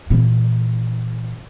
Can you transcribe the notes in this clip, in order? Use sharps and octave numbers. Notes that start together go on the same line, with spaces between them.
A#2 E3